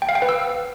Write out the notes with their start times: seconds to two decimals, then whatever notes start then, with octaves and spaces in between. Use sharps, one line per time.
0.02 G5
0.09 F5
0.15 G5
0.22 B4
0.29 E6